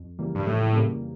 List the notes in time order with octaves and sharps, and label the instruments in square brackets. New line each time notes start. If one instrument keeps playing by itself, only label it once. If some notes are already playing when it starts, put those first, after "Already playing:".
Already playing: [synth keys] F2
C#3 E3 G3 A#3
[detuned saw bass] G2
[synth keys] F2 [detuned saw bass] A2
[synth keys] C#3 E3 G3 A#3